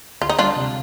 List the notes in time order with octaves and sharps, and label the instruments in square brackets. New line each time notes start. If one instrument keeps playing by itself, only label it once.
[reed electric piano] D2 [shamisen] F4
[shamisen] D#4
[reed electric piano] G3 [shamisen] D4 F4
[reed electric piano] C3